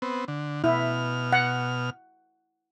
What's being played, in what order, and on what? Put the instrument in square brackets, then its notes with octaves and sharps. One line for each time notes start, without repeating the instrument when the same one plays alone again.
[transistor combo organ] B3 C4
D3
[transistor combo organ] B2 F6 [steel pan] E4
[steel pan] F#5